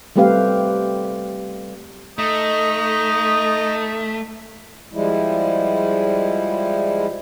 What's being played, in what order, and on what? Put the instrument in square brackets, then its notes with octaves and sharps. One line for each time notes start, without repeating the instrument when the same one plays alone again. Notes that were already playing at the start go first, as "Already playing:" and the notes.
[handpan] G3 A3 C4 G4 B4 F5
[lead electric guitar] A3 [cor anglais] D#4 [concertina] D#5
[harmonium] F3 G3 G#3 E4